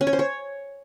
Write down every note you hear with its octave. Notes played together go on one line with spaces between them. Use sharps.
C#4
C#5
C5
C#5